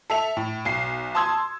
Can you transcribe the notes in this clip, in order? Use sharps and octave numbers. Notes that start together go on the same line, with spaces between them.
A4 E5 F7
A2
B1 C7
A5 C6 D#6 E6 G#6